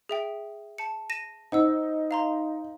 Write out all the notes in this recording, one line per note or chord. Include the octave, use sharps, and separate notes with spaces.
G#4 E5 G5
A5 C#7
A#6 D#7 E7
D#4 C5 F#5 E6
F5 A#5 C6